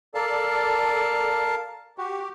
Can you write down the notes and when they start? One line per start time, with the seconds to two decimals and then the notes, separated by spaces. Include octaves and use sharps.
0.15 A4 A#4 D5 F5 A5
1.98 F#4 G4